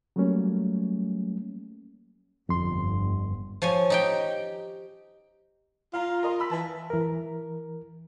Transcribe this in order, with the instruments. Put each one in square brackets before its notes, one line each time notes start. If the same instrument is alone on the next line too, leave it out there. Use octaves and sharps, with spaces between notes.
[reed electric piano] F#3 G3 A3 A#3 C#4
[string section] G1 [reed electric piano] F2 C6
[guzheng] F3 C#5 G#5
D#4 G4 G5
[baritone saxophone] F4 [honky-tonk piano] F5 A#5
[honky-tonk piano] A#4 D#5 C6
B5 E6 B6
[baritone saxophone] E3 [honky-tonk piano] A5
[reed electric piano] E3 A#4